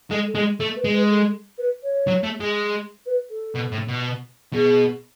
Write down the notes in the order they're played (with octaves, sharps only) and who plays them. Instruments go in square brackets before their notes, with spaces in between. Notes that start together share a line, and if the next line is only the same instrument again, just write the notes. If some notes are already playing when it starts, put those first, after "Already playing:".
[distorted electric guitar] G#3 [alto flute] A4
[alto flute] A4
[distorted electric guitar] G#3
[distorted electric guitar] A3 [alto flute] A4
[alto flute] B4
[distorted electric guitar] G#3
[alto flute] B4
A4
B4
C#5
[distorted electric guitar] F#3
A3
G#3
[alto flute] B4
A4
[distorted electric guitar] B2
A2
B2
[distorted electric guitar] B2 [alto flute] G#4